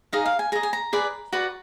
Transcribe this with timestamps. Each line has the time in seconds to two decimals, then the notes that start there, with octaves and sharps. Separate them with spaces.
0.12 D#4 G#4 D#5 F5
0.26 F5
0.39 G#5
0.52 G#4 D#5 A#5
0.63 G#5
0.73 A#5
0.93 G#4 B4 D5
1.32 F#4 B4 D5